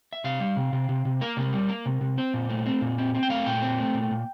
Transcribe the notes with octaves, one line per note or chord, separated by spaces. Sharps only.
E5
C3 F5
G3
C3
C3
C3
C3
A#3 A#4
C3
G3
A#3
C3
C3
C4 C5
A#2
A3
C4
A#2
C4
C4
G5
A3 F5
A#2 G5
C4
A3
A#2
A#2